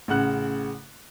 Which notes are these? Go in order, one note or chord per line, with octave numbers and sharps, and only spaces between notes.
A1 C#3 F#5 F#6